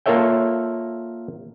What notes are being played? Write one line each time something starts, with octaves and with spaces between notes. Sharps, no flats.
A#3 F4 A4 C#5 E5 G5